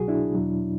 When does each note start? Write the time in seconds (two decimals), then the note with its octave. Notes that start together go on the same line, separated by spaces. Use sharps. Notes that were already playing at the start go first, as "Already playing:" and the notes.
Already playing: C2 B2 F#3 F#4 G#4
0.08 D4 E4
0.35 E2 B2 F#3